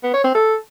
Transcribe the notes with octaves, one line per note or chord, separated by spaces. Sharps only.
B3
C#5
C4
A4